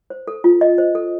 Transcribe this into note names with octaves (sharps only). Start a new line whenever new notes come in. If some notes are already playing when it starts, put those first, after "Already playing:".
C5
A4
F4
D#5
C5
A4